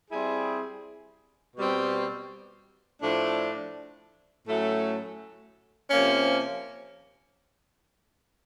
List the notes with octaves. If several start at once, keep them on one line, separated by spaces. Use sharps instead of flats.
G3 C4 E4 G#4
B2 G3 C4
A2 F3 A3 D4
A2 F#3 A3 C#4
C3 F3 A#3 C#4